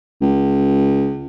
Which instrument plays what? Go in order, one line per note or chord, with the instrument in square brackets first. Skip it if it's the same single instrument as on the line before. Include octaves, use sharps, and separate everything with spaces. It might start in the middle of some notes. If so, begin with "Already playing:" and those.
[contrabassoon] C#2